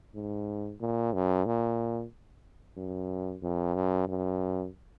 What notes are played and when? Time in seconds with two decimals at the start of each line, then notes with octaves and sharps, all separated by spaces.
0.15 G#2
0.80 A#2
1.13 F#2
1.46 A#2
2.77 F#2
3.42 F2
3.75 F#2
4.08 F#2